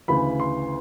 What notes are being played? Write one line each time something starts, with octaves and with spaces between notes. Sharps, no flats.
D2 C#3 E3 B5
C6